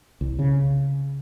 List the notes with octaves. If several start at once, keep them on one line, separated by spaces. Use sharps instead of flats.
C2
C#3